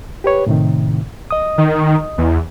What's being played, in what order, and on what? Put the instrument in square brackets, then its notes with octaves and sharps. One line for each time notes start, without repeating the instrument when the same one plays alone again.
[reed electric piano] G4 B4 C#5
A2 C3 D#3
D#5 D#6
[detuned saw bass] D#3
E2